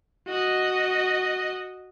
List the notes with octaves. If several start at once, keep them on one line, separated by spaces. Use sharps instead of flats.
F#4 D#5